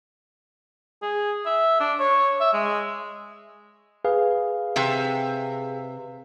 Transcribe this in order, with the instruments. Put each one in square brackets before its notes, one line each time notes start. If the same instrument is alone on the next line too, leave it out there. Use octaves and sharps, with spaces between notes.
[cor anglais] G#4
E5
D4
C#5
E5
G#3
[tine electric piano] G#4 B4 F5
[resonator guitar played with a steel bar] C3 E5